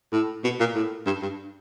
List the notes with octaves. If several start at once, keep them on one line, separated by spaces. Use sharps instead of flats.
A2
B2
A#2
A2
G2
G2